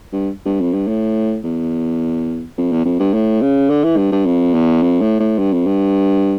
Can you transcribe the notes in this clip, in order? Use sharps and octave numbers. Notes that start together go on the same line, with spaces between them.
G2
G2
F2
G2
A2
E2
F2
E2
F2
G2
A2
C#3
D3
E3
G2
G2
F2
E2
F2
A2
A2
G2
F2
G2